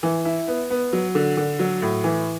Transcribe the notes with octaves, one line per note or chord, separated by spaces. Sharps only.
E3
E4
B3
B3
F#3
D3
D3
F#3
A2
E3